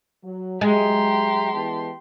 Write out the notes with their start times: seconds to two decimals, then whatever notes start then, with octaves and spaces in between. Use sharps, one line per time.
0.24 F#3
0.61 F#3 G#3 G4 E5 A#5 C6
1.53 E3 B3 A5